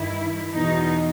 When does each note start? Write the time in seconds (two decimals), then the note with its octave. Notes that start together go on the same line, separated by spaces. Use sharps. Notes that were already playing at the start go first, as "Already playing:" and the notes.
Already playing: G2 D#3 E4
0.53 E2 B2 D#4